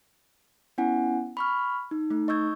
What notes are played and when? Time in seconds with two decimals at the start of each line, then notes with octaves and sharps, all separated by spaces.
0.78 B3 C#4 E4 F#5 G#5
1.37 B5 C#6 F6
1.91 D#4
2.10 A3 D#4
2.28 D#5 C#6 E6 G6 G#6